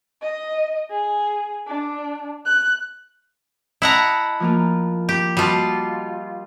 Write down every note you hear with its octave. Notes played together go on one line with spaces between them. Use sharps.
D#5
G#4
D4
F#6
E4 D#5 F#5 A5 A#5
F3 A#3 F4
G4
G3 F4 F#4 D#5 A5